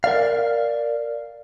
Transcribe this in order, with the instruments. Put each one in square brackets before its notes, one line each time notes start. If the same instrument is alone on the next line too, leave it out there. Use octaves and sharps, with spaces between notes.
[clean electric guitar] A#4 D5 F5